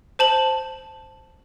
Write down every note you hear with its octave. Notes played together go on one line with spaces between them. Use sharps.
C5 A5 F#7